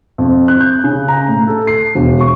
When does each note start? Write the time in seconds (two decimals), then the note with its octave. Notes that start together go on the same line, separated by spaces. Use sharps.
0.18 F2
0.48 F#6
0.61 G6
0.84 C#3
1.08 A#5
1.28 A2
1.47 A4
1.67 C7
1.95 E1
2.21 C#6